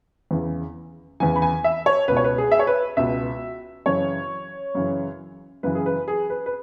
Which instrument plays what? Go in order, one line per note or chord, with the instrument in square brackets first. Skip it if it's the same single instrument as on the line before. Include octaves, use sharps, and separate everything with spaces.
[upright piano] E2 C#3 E3
E2 C#3 E3 G#5
B5
G#5
E5
C#5
C#2 B4
B2 C#5
B4
G#4
E5
C#5
B4
C#2 B2 E5
F#2 C#3 E3 C#5
F#2 C#3 E3
F#2 C#3 E3 B4
G#4
B4
G#4
B4
B4